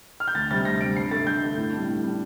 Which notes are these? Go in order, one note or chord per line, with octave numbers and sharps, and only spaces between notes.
F6
G6
D2 A6
C3 G3 A6
D2 A#6
C3 G3 D7
G2 C7
D3 A3 A6
G2 G6
D3 A3
A2
G3 D4
A2
G3 D4